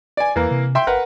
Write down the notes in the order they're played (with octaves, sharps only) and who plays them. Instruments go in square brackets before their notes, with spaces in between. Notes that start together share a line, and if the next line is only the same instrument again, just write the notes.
[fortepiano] D5 G#5
[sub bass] E2 [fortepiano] E3 A#3
[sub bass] C3
[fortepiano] E5 G5 C6
[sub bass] G1 [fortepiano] A#4 B4 F#5